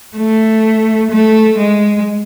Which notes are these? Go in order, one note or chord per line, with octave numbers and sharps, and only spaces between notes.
A3
A3
G#3